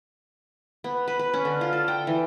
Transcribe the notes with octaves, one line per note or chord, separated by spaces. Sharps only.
B3
B4
B4
C#4
D3
F4
A4
G5
E3